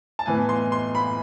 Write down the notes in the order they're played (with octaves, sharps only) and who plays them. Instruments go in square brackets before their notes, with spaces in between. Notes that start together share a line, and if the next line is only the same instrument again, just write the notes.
[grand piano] A5
A2 E3 B3 G#5
C6
C6
B5